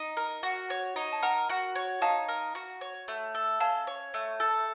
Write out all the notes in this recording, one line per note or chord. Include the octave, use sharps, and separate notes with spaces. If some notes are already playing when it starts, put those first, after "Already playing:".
Already playing: D#4
A#4
F#4
C#5
D#4
A5
A#4 F#5 A#5
F#4
C#5
D#4 F5 A5
A#4
F#4
C#5
A3
A4
C#4 F5 A5
C#5
A3
A4